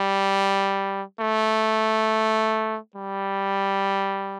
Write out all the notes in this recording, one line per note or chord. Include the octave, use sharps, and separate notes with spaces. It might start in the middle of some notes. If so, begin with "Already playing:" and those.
Already playing: G3
A3
G3